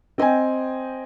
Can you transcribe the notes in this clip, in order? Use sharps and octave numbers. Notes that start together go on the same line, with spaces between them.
C4 D#5 G5 G#5